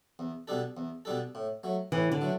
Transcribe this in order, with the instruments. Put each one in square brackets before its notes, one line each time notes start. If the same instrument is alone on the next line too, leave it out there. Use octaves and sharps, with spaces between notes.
[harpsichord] E2
B2 G3 D4 A4
E2
B2 G3 D4 A4
A2
F#3 A3
[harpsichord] A2 [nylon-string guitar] E3
[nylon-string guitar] D3
[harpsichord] F#3 A3